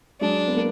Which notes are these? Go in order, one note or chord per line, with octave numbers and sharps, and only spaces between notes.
F#3 G#3 D4
B3
A#3